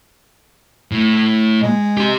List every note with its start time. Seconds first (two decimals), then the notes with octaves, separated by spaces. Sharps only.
0.92 A2
1.62 G#3
1.97 G4 C6